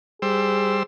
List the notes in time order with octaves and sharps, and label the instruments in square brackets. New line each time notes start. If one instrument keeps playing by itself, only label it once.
[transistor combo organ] G3 C5 E6 [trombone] G#4